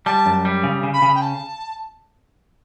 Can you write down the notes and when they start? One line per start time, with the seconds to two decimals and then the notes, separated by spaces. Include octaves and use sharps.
0.06 G3 A5
0.26 F#2
0.45 G3
0.63 C#3
0.83 C#3
0.94 B5
1.02 C#3
1.15 G5
1.22 A5